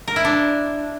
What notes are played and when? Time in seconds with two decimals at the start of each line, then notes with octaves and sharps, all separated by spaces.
0.08 A#4
0.16 E4
0.25 D4